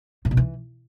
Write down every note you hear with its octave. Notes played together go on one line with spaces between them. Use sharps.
A2
B2
E3